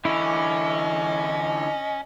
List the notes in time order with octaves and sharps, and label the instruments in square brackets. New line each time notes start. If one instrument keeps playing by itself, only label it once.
[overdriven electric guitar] D3 E3 [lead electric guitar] C#4 [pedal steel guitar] E4 [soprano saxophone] D#5